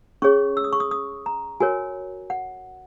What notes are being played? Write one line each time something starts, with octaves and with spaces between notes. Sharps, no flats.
C#4 G#4 C#5 C#6
E6
D#6
C#6
D#6
D#6
A#5
F#4 A#4 C#5 G#5
F#5